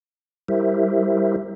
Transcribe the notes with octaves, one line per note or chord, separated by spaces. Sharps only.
G3 E4 G4 A#4 C5 E5